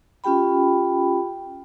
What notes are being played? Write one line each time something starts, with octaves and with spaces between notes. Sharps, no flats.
C#4 F4 G4 G5 B5